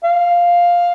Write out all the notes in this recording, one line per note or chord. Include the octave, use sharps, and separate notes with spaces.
F5